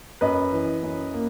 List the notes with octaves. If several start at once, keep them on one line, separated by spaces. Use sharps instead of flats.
F#2 B4 D#5
E3
F#2
A#3